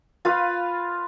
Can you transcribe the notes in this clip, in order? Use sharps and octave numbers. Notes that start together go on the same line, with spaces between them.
F4 B4 F5